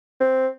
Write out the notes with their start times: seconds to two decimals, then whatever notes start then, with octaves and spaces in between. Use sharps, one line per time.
0.20 C4